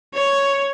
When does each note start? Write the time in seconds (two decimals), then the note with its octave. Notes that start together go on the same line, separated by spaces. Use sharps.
0.14 C#5